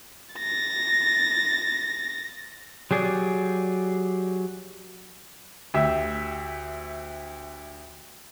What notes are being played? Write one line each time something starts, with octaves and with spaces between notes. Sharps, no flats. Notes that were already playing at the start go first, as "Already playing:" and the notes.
A6 A#6
F#3 G4 G#4 D5
D2 G4 E5